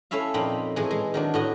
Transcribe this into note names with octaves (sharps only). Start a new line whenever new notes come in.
A3 C#4 E4 E5 F5
F2 A#2 C4 D#4 B5
A2 E3 G#3
G#3
D#3 F#3 D4
A2 F#4 D#5